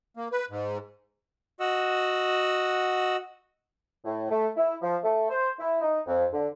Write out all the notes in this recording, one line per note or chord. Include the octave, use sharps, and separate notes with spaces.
A#3
B4
G#2
F#4 D#5 F#5 E6
A2
A3
E4
F3
A3
C5
E4
D#4
F2
D3